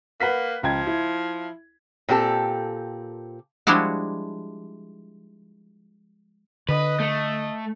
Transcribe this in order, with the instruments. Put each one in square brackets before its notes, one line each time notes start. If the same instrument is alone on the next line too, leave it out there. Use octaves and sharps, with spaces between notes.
[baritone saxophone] A#3 [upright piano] B4 F#5 B6
[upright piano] C#2 G5 G#6 [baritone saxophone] F3
[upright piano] E4
[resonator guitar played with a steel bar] A#2 C4 G4 A4
[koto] F3 G3 G#3 D4 E4 F#4
[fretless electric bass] D3 [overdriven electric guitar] B4 [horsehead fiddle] D#5
[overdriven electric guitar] A3